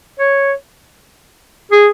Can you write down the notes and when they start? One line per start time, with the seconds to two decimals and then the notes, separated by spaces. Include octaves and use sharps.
0.20 C#5
1.72 G#4